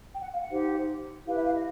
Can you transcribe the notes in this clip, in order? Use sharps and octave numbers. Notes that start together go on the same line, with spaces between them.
G5
F#5
F5
F#5
D#4 G4 C5
E4 G4 B4 F5
E5
F5
D#5